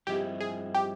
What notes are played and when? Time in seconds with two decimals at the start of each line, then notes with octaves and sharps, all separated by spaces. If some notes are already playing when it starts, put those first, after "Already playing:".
0.07 G2 F3 G#3 C4 E4 G4
0.40 G#4
0.74 G4